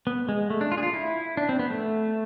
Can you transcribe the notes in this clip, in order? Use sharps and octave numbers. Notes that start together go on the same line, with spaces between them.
B3
G#3
A3
D4
F4
G#4
F4
E4
D4
C4
B3
A3